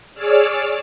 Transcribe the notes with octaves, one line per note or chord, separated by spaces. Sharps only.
G#4 C#5 D5 D6 E6 F6